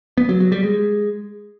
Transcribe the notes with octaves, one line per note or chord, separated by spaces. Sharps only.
B3
F#3
F#3
G3
G#3